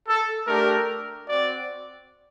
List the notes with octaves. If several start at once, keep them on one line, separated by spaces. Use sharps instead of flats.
A4
A3 D4 G4 A#4
C4 F#4 D5